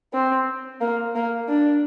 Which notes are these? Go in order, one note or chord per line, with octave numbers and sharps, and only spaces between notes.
C4
A#3
A#3
D4